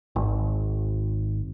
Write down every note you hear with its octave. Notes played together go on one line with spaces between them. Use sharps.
G#1